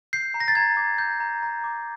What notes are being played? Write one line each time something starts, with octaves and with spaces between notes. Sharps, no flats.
G6 C7
A#5
A#6
A6
A#5 G#6
D6
G6
A#5
A#5
D6